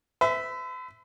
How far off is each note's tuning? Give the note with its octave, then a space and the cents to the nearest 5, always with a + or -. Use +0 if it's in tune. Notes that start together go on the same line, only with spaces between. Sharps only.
B4 +45 E5 -5